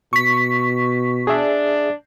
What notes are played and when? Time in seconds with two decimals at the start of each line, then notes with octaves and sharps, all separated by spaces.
0.13 B2 C#6 B6
1.27 D4 G#4 E5